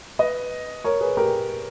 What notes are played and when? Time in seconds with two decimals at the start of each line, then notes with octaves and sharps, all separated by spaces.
0.19 B4 D#5
0.84 A#4 C#5
1.01 G#4 B4
1.17 G4 A#4